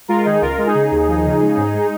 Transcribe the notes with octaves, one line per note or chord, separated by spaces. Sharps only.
G#3 F4 A#4
D#3 D#4 G#4
C#2 F4 A#4
G#3
D#4 G#4
C#3
D#2
F3
C#3
G#3
G#2
G#3